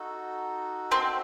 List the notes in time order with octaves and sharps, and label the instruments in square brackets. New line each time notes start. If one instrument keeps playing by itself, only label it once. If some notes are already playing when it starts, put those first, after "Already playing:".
Already playing: [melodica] D#4 F#4 A4
[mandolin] C4